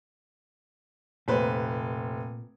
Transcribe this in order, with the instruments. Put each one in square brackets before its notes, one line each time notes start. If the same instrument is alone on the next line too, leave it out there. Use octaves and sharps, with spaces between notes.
[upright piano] F1 B4 C5 [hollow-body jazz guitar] A#2